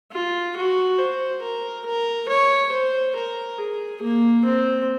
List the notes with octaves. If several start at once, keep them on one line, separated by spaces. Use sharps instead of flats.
F4
F#4
C5
A#4
A#4
C#5
C5
A#4
G#4
A#3
C4